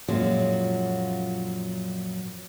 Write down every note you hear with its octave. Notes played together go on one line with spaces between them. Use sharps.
F#2 A#2 F3 F#3 G#3